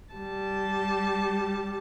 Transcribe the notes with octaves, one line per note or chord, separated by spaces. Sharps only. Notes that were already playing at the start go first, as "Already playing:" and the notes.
G3 A5